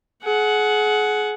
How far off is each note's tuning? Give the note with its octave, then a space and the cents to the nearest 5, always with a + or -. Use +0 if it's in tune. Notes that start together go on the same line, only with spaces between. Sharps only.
G#4 +35 F#5 +0